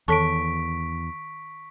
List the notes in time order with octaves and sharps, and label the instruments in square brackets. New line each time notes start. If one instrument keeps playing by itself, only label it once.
[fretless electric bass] E2 [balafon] D#3 A4 A5 [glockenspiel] C#6 B6 D7